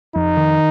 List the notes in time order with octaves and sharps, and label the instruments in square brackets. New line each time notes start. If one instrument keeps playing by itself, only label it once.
[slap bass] F2 [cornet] D#4
[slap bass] D#3